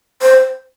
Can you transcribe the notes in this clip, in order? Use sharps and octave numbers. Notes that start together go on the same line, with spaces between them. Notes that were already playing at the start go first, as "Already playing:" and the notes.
C5